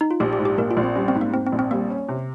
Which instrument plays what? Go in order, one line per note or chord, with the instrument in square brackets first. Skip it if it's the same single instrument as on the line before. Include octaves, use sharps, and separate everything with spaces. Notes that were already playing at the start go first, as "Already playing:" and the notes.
[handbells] D#4
F4
[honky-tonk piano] A#1 [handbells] G4
[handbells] G4
[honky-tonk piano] G#2
[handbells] G4
[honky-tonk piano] A#1 [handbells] A#3 A#4
[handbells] F4
[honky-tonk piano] A#1
[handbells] C4
[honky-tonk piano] G3 [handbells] C#4
[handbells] C4
[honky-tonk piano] G#2
[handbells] A#3
[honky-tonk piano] G#2 [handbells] C4
[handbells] C4
[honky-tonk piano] A#1
[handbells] C4
[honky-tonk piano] G3 [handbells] A#3
[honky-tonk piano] C#4
C3